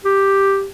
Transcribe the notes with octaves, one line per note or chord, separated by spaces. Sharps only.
G4